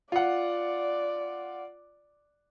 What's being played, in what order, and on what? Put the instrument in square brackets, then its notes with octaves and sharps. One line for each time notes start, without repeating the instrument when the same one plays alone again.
[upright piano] F4 F#5 [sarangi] D5